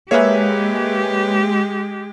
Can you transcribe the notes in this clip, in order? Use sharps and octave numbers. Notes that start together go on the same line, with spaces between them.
G#3 A#3 G4 G#4 B4 C#5 E5